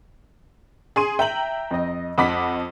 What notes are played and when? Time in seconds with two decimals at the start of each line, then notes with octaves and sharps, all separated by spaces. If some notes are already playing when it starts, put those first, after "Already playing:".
0.96 G#4 C6 D#7
1.19 E5 G5 A#5 F#7
1.71 F2 D#5
2.18 F2 D#5 F#5 B5 D6 B6